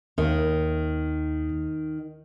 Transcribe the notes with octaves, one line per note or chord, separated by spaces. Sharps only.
D#2 D#3